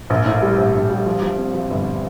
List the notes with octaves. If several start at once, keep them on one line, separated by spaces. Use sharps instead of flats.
A#1
A2
G3
A#1
A#1
G3
F3
F3
C4
F3
G1